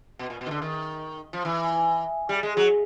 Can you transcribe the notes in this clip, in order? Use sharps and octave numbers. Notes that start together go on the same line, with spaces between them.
B2
A#2
B2
D#3
D3
D#3
F3
E3
G3
G#3
F#3